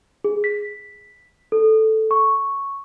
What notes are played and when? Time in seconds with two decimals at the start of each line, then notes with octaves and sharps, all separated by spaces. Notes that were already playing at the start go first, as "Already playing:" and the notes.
0.24 G#4
0.44 B6
1.52 A4
2.11 C#6